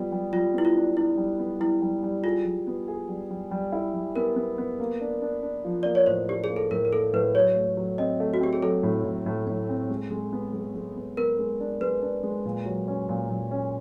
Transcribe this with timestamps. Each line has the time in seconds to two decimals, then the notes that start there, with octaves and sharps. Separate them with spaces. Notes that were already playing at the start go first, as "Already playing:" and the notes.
Already playing: G3 B3 F4
0.12 G3
0.33 G3 F4
0.54 B3 E4
0.65 F4
0.76 D4
0.97 D4 E4
1.17 G3
1.39 B3
1.60 G3 E4
1.82 G3
2.03 G3
2.24 F4 G#4
2.45 G3
2.67 B3
2.88 G#4
3.09 G3
3.30 G3
3.51 G3
3.72 E4
3.94 G3
4.16 B3 A#4
4.36 B3
4.58 B3
4.80 A#3
5.01 D4
5.22 D4
5.43 D4
5.65 F3
5.83 A#3 D5
5.95 C#5
6.06 A2 C5
6.29 D4 G4
6.44 G#4
6.49 A#3
6.56 A4
6.71 A2 A#4
6.85 A#4
6.92 A#3 A4
7.13 A2 B4
7.35 F#3 C#5
7.56 A3
7.77 F#3
7.98 C4 D#5
8.20 A3
8.34 F#4
8.40 C4 G4
8.53 G#4
8.63 F#3 A4
8.83 A2
9.05 A2
9.26 A2
9.47 A2
9.69 C4
9.90 G#3
10.10 G#3
10.33 B3
10.53 G#3
10.75 G#3
10.96 B3
11.17 B3 A#4
11.39 G#3
11.60 D4
11.80 G#3 B4
12.02 D4
12.23 G#3
12.45 A#2
12.66 F#3
12.88 C#4
13.09 A#2
13.30 A#2
13.51 C#4